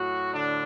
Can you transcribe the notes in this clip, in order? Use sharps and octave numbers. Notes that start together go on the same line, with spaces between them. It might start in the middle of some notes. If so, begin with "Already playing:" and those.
Already playing: A2 F#3 F#4
D3 D4